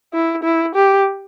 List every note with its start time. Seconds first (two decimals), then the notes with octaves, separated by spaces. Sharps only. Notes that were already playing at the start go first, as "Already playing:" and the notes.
0.13 E4
0.44 E4
0.75 G4